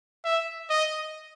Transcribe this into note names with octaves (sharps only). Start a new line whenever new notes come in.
E5
D#5